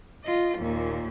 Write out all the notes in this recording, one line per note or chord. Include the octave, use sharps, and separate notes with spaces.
F4 D#5
D#2 A#2